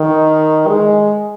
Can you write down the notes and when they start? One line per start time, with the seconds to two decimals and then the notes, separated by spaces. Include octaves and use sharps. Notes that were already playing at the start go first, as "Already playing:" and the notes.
Already playing: D#3
0.68 G#3